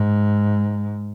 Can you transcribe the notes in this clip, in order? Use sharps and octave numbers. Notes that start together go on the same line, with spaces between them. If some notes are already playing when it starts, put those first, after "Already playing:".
Already playing: G#2